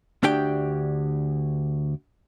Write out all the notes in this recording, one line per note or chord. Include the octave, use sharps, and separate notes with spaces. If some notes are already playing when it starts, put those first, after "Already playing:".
D2 D4 G4 G5